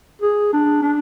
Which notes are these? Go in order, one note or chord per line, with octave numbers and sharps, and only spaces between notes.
G#4
D4
D4